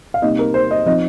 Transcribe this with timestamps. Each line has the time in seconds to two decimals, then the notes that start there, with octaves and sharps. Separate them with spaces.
0.14 F5
0.22 C3 G3 A#3 D#4 D#5
0.39 A#4
0.54 C5
0.71 D#5
0.86 F3 C4 D#4 D#5